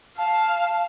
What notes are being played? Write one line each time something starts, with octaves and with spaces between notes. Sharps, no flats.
F5 A5